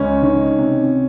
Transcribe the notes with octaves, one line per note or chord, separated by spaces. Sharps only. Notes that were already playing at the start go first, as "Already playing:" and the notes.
Already playing: C#2 C#4
D#3
C3